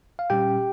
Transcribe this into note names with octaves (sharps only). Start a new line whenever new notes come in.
F5
A#2 G3 C#4 G4 G5